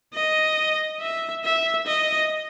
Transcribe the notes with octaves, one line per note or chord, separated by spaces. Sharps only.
D#5
E5
E5
D#5